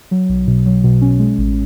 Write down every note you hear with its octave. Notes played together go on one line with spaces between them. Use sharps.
F#3
B1
B2
F#3
B2
C#4
G#3
A1